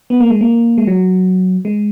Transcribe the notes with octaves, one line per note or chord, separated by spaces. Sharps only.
B3
A#3
G#3
A#3
G#3
F#3
G#3